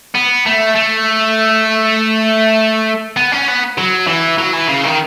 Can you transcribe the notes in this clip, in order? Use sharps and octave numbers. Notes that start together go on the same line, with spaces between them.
B3
A3
A3
B3
C#4
B3
F#3
E3
F#3
E3
C#3
D#3